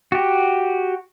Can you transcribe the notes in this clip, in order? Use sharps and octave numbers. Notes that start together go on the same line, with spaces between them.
F#4 G4